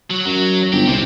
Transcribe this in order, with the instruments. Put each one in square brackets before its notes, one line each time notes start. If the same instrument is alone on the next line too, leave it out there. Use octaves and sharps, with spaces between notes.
[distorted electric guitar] F#3
[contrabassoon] F#2 [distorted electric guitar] F#3
[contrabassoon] G1 [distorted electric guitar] G4
[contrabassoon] C2 [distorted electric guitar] C3 C4